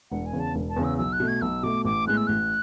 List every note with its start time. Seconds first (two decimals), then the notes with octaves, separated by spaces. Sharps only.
0.11 E1 F#5
0.26 G#5
0.33 E2 C#3
0.40 A5
0.55 E1
0.69 A5
0.76 E2 C#3
0.84 E6
0.98 B1 E6
1.13 F#6
1.20 B2 A3
1.28 G#6
1.42 B1 E6
1.63 B2 A3 D6
1.85 A1 D6
2.07 A2 G#3 B3 F#6
2.17 E6
2.27 A1 F#6